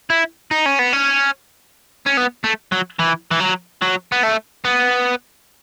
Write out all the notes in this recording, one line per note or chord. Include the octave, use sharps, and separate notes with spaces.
E4
D#4
C#4
B3
C#4
C#4
B3
A3
F#3
E3
E3
F#3
F#3
B3
A3
B3